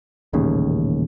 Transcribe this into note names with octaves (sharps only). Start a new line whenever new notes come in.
D#1 A1 D#2 C#3